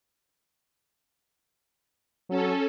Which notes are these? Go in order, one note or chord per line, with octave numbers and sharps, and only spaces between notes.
F#3 C#4 A4